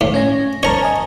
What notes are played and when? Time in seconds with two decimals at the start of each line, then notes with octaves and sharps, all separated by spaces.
0.01 A2
0.14 C#4 C#5 A#6
0.63 A#4 C#5 A5 A#5 C#7
0.82 D#5 G#5